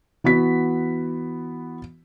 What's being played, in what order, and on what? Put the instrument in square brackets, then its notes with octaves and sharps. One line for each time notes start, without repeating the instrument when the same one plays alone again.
[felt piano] E3 B3 F#4 B6